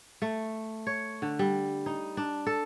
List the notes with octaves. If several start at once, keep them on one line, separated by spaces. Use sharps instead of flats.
A3
C#5
D3
G3
D#4
D4
A4